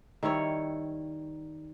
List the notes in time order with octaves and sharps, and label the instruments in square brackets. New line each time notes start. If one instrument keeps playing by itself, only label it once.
[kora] D#3 G3 E4 C#5